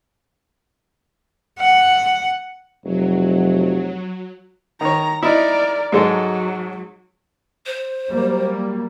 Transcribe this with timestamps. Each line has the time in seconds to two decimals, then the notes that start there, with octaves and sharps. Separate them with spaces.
1.60 F#5
2.84 F1 F#3
4.81 D#3 C#5 A#5
5.23 D#4 E4 A#4 D5
5.92 G#2 F#3 G#3 A4
7.66 C5
8.10 F#3 G3 A#3